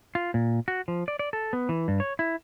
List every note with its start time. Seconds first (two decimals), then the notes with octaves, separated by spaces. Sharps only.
0.15 F4
0.34 A#2
0.68 F#4
0.88 F3
1.08 D5
1.19 D5
1.33 A4
1.53 B3
1.69 E3
1.88 G2
2.00 C#5
2.19 E4